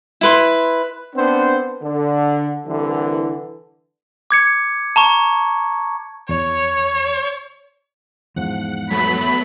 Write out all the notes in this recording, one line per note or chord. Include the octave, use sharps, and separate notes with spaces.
E4 B4 C6
B3 C4 D4 C5
D3
C2 D3 E3
D6 G#6 C#7
A5 A#5 C#6
E2 C#5
E2 G#2 F3 F#5
F#3 A3 B3 B5